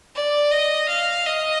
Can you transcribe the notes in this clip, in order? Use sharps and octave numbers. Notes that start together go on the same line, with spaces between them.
D5
D#5
F5
D#5